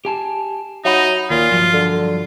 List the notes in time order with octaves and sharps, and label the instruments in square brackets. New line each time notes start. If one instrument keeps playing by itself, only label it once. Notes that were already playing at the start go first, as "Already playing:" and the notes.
[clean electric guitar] G4 G#5 A5
[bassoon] F#3 [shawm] D#4 [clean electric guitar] E5 F#5 B5
[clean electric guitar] D#2 [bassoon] A#2 [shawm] F4
[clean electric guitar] G2 F3 F#3
[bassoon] D3